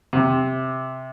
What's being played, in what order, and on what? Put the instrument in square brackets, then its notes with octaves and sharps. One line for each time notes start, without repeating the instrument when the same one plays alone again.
[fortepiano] C3